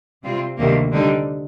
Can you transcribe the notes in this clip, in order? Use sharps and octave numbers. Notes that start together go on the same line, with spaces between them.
C3 G3 C4 F4
D2 C3 D#3 G3 A#3
D3 G3 C4 D#4